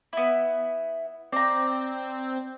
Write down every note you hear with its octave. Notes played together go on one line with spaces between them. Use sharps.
B3 E4
C4 D5 A#5